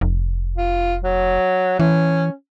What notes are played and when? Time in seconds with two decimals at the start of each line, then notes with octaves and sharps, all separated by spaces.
0.01 F1
0.58 F4
1.04 F#3
1.79 E3 C#4